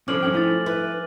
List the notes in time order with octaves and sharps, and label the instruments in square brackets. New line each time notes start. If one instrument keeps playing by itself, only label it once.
[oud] F3 [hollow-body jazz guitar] C#4 D4 A4 [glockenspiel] D6 F6 F#7
[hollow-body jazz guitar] G2 C#4 G5
[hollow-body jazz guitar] A3 D#4 [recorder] E4 [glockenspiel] G#5 A6
[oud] E4 [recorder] B4